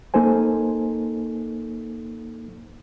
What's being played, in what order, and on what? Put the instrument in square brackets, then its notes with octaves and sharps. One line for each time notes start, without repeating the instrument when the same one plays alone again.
[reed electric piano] A#3 D#4 A4 C5 G#5